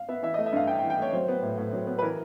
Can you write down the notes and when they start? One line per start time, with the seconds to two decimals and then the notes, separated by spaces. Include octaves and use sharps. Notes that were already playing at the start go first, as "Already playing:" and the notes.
Already playing: F5
0.09 B3 E5
0.23 E3 E5
0.34 A3 D#5
0.46 E5
0.52 G2 F5
0.67 G2 G5
0.79 G5
0.83 E3
0.90 G5
0.99 A3 C#5
1.13 F#3 C5
1.28 B3
1.42 A2
1.57 A2
1.73 F#3
1.87 B3
1.99 B4
2.02 E3 A#4